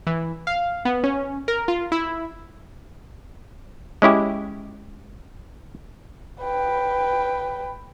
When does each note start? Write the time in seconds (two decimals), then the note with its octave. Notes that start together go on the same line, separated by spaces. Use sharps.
0.07 E3
0.47 F5
0.85 B3
1.04 C#4
1.48 A#4
1.68 F4
1.92 E4
4.02 G#3 C#4 E4 G4
6.42 B4 G5